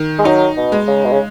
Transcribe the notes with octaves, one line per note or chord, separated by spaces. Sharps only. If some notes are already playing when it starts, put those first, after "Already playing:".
Already playing: D#3
G#3
F#3 D#4
B2
G#3
C#3
B2
C#3